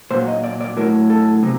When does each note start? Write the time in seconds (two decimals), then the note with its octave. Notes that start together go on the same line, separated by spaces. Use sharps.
0.11 A#2 F#3 C5
0.28 D#5
0.44 D5
0.61 D5
0.77 A2 F#3 A#4
1.10 A4
1.43 C3 F#3